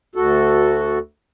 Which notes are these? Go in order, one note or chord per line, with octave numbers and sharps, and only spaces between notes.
D2 F#4 A4